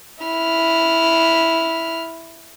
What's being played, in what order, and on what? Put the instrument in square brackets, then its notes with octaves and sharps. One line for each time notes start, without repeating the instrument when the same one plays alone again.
[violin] E4 F6